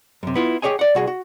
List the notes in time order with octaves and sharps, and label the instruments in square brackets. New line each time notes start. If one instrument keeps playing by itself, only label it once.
[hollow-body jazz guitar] F#2 C3
B3 E4 F4
G4 G#4 C#5 D#5 G#5
D5 F#5
C2 F#4 G#4
F#4